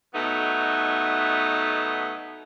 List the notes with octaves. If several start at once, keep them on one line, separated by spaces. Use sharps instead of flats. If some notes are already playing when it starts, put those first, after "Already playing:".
B2 F#3 A3 B3 D#4